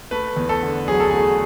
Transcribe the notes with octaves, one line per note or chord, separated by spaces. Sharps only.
A3 B4
E2
A4
D3
F#3 G#4
A4
A3 G#4